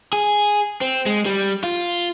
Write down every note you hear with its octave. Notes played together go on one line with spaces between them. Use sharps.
G#4
C4
G#3
G3
F4